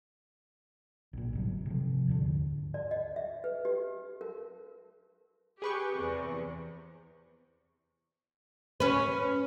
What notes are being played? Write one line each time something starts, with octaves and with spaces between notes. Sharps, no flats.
B1 A#2
G1 G#2 F#3
C3 F3
D#2 G#2 D3
D5
D#5
E5
B4
G4
A#4
G4 G#4 B4 C#6
E2 C3
C#4 B4